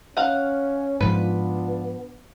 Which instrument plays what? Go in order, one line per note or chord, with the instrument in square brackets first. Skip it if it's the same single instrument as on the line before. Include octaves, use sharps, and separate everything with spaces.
[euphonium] C#4 [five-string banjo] F5 F#5
[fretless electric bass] G#2 F3 [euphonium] B3 [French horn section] D4 F4 [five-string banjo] B4